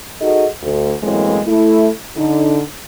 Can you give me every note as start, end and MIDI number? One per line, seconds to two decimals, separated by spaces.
0.20 0.45 63
0.20 0.45 66
0.20 0.45 68
0.20 0.45 69
0.20 0.45 75
0.62 0.94 38
1.03 1.40 42
1.03 1.40 45
1.03 1.40 52
1.03 1.40 56
1.03 1.40 58
1.03 1.40 60
1.47 1.89 57
1.47 1.89 64
2.17 2.62 50
2.17 2.62 63